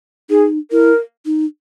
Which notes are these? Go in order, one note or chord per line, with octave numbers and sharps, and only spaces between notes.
D#4 G#4
E4 A#4
D#4